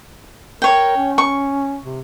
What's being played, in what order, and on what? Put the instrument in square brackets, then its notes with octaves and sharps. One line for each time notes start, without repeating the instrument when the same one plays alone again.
[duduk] A#4 [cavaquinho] C#5 G5
[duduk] C#4
[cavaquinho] C#6
[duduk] C3